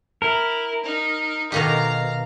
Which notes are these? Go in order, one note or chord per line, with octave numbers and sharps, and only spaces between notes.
E4 A#4
D#4
B2 D#3 G4 F5 A#5